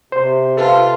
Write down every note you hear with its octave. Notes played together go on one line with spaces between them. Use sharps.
C3 C5
F4 A4 B4 A5